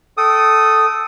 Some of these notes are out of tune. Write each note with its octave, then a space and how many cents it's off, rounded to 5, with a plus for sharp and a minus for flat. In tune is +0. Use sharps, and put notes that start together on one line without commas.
A4 +0 G5 -30 D#6 +0